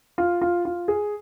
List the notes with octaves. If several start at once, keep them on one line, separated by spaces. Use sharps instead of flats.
F4
F4
F4
G#4